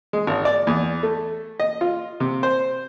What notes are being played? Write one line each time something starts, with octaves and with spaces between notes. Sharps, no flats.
G#3
G#1
D5
E2
A3
D#5
F4
C3
C5